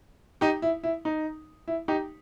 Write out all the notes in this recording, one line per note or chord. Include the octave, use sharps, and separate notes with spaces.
D#4 G4
E4
E4
D#4
E4
D#4 G4